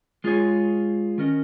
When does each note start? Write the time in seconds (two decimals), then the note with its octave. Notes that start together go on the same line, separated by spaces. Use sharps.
0.24 G#3 F4 G#4 C#5
1.18 D#3 C#4 A#4 D#5